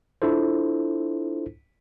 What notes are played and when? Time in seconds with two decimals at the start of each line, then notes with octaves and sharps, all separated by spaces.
0.22 D4 E4 F4 A4 C5